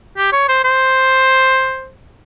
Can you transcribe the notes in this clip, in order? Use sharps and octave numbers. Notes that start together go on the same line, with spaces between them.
G4
C#5
C5
C5